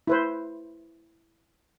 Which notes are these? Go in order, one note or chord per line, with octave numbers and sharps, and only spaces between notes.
E4 B4 C5